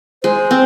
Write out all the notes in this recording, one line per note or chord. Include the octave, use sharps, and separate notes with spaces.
G#3 C5
C4